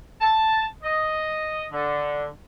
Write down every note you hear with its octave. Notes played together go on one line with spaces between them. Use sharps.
A5
D#5
D3